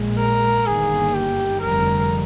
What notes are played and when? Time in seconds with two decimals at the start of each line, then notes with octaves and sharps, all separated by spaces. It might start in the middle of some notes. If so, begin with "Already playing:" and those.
Already playing: A#1 A#2 G#3
0.18 A#4
0.66 G1 G2 D#3 A#3 G#4
1.14 G4
1.61 F1 F2 D3 G3 A#4